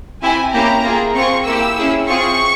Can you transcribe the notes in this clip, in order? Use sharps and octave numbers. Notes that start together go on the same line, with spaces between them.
C4 E4 G4 G#5
A#3 C#4 E4 G4 A#5
A#3 F4 G#4
C4 F4 G#4 C#6
A#3 E4 G4 E6
C#4 E4 G#4
C4 F4 G#4 C#6